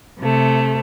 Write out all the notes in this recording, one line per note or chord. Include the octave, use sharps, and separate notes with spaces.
C3 A3